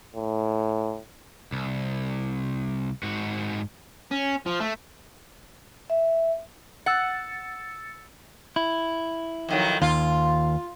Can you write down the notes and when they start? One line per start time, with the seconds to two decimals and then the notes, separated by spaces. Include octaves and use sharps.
0.16 A2
1.52 C2
3.03 G#2 F#4
4.11 C#4
4.46 F3
4.60 A3
5.90 E5
6.86 F#5 E6 A6 C#7
8.56 E4
9.49 F2 D#3 F#3
9.82 D#2 F4